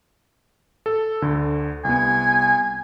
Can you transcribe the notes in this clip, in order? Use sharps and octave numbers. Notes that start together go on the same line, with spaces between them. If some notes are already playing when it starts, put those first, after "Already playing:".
A4
D2 D3
C2 B3 G#5